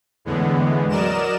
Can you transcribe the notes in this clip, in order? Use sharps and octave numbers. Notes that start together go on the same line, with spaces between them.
E2 A2 D3 E3 G#3 B3
F#3 A#4 D5 D#5 E7